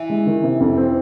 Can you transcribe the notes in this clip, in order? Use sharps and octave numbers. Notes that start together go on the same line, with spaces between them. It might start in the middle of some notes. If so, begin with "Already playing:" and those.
Already playing: E3
G#3
D#3
C3
F2
C4